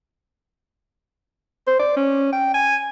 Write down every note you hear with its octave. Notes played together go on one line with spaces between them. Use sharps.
C5
D5
C#4
G5
G#5